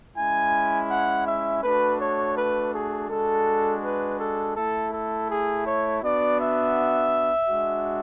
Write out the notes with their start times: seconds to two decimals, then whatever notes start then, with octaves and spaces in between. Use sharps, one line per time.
0.16 G#3 C#4 E4 G#5
0.90 F#5
1.27 E5
1.63 A3 D4 F#4 B4
2.00 C#5
2.36 B4
2.74 G#4
3.10 G#3 D4 F#4 A4
3.83 B4
4.20 A4
4.57 A3 E4 A4
4.93 A4
5.29 G#4
5.67 C#5
6.03 B3 D4 F#4 D5
6.40 E5
7.49 G#3 D4 F#4